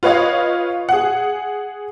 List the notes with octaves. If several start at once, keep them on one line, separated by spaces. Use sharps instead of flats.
F4 B4 C#5 D#5 F5
G#4 F#5